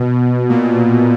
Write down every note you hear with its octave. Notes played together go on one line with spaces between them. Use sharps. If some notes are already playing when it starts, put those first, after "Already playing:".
Already playing: B2
A#2